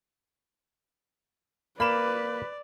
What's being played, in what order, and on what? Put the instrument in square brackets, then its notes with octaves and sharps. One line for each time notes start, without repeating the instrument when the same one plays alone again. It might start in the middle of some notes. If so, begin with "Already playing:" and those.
[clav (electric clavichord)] A#3 A#4 [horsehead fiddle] B4 [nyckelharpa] D5 [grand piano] B5 E7